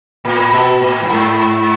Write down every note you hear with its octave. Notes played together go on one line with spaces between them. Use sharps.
A2
B2
A2
G2
G#2